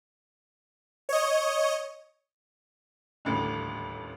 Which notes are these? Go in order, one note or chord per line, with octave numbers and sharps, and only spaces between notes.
C#5 D#5
D#1 A1 D2